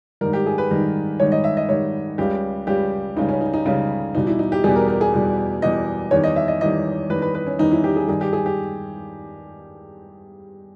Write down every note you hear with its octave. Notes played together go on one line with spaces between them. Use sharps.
G#2 D#3 G3 A#4
G4
G#4
B4
G#2 D#3 G3
G#2 D#3 G3 C#5
D#5
E5
D#5
G#2 D#3 G3 C#5
C#2 C#3 G3 G4
C#2 C#3 G3 G4
C#2 C#3 G3 D#4
C#4
D#4
D#4
C#2 C#3 G3 C#4
E2 B2 G3 D#4
E4
D#4
G4
E2 B2 G3 G#4
A#4
A#4
G#4
E2 B2 G3
E2 B2 G3 D#5
E2 D#3 G3 C#5
D#5
E5
D#5
E2 D#3 G3 D#5
E2 D#3 G3 B4
B4
B4
C#4
E2 D#3 G3 D#4
E4
G4
G#4
G2 D#3 G3 G#4
G4
G#4
G4